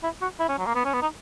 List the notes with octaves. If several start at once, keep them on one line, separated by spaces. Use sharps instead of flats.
E4
F#4
E4
C#4
F#3
A#3
B3
C#4
B3
D#4